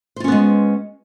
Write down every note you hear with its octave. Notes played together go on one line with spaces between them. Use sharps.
G#3 B3 C#4 F4 C5